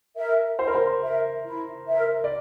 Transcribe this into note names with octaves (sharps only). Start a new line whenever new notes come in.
A#4 E5
E4 C5
A#4
C5
A#4 E5
E4
A#4 E5
D5